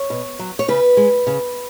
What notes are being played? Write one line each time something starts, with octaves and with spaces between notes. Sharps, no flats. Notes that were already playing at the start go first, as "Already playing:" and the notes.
Already playing: C#5
B2
F#3
C#5
C#3 B4
G#3
C#3